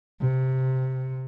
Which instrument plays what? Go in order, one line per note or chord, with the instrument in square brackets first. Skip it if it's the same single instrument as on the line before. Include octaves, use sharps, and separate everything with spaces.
[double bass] C3